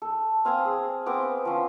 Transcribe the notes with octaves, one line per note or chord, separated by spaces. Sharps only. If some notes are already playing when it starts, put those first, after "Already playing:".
A4
C4 F5 G#5 D#6
G#4
B3 C4 D6 D#6
F3 C#4